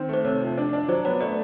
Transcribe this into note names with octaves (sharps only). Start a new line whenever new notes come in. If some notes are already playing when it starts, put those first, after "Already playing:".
Already playing: D#3 C4
A3 C5
C3 C#5
F3
D4
D4
F#3 C5
B3 C#5
A3 D5